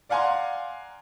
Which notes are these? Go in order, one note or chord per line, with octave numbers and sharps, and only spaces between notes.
D5 F5 F#5 G#5 A#5 C6